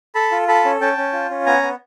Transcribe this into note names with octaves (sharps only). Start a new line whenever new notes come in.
A4 A5 B5
F4
A4 A5 B5
C#4
C#4 G5 A5
C#4
F4
C#4
B3 G#5 A#5
B3